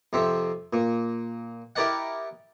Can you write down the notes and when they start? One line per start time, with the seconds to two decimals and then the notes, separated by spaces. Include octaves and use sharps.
0.13 F2 C3 C4 E5
0.73 A#2
1.76 E4 G4 A#4 D5 D#5 F#5